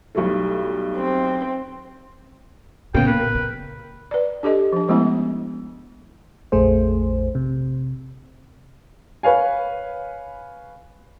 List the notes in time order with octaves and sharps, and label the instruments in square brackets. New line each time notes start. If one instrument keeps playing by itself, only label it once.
[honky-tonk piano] B1 G3 A3 [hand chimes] E4 G4 C#6
[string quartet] C4
[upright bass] A#2 [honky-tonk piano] C#3 B3 [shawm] G5
[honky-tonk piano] A#3 [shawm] B4
[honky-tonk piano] A#4
[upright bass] C#3
[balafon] B4 D5
D4 G4 A4 D#5
F3 D4
F3 G#3 A3 B3 C#4 E4
[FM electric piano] A#1 F2 A3 G#4 C5
C3
[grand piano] B4 C#5 F5 G#5